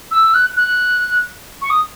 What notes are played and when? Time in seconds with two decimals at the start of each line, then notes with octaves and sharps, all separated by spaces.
0.11 E6
0.34 F#6
0.56 F#6
1.62 C#6
1.70 D#6